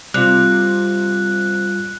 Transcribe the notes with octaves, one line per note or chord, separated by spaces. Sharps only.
C3 G3 F4 F#6